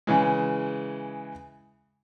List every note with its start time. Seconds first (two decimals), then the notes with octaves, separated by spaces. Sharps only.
0.07 C#3 E3 G#3